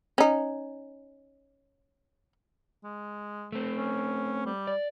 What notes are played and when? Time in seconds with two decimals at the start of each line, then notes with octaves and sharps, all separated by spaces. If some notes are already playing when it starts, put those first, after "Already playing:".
0.18 C#4 D#4
2.84 G#3
3.52 A3 C4
3.77 C#4
4.46 G3
4.67 D5